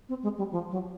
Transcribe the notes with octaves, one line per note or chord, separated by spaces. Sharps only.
C4
G#3
G3
F3
F#3